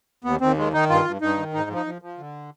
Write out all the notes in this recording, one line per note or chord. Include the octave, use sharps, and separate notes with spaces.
D#2 B3
D#2 C4
D#3 G#3
D#3 D#4
G2 F4
G2
G2 D#4
D#3
G#2 D#4
F3
D#4
F3
F3
D3